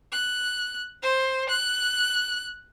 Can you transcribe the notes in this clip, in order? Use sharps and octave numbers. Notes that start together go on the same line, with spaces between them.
F#6
C5
F#6